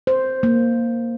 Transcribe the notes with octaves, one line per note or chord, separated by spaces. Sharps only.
C5
A#3